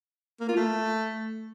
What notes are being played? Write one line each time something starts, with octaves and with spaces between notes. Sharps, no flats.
A#3
F4
A3